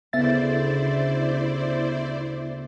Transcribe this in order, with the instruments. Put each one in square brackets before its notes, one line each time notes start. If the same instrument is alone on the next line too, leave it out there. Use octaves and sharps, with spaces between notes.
[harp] D2 C#3 [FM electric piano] B3 E5 A6 [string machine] E4 C5 D5